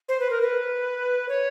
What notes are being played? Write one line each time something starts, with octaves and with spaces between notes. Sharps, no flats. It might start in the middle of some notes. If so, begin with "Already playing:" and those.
C5
B4
A#4
B4
C#5